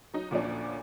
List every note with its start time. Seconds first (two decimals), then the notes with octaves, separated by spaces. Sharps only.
0.14 F#3 D#4
0.31 D2 A#2 F3 C#4 D4